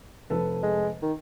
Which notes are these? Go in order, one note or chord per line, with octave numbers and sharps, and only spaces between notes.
F1 A4 B4
G#3
D#3